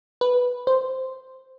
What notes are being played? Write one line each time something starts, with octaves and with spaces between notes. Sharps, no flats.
B4
C5